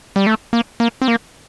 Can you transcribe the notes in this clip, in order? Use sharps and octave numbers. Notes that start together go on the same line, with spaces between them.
G3
A3
A#3
A#3
C4
A#3